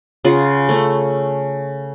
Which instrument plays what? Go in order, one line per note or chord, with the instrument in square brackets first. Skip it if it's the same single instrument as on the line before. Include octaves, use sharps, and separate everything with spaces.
[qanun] C#3 F4 G#4 F#5
A3 C#4